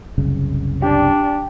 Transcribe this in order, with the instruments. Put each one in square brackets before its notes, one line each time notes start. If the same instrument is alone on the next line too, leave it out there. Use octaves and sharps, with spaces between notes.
[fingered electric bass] F#1 C2 C#3
[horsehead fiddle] D4 [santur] G4 D5